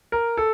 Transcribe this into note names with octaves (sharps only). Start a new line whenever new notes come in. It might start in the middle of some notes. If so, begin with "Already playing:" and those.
A#4
A4